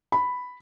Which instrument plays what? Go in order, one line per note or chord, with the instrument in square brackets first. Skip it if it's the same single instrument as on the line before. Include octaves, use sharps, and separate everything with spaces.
[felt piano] B5